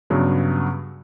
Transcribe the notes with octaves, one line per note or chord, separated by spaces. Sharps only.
G2 C#3 F#3 B3